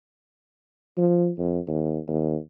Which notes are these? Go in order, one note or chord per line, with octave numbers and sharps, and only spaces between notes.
F3
F2
D#2
D#2